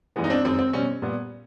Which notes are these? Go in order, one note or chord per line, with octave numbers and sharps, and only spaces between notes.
G2 E3 G#3 B3
D#4
C4 D4
F#2 D#3 G#3 C4
C4
B2 G3 C4 C#4
A#2 G3 B3